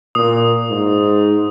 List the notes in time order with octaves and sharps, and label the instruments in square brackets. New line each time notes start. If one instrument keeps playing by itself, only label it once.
[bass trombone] A#2 [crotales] D#6
[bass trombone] G#2